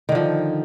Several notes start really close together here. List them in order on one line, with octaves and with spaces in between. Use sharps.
D#3 D3 F3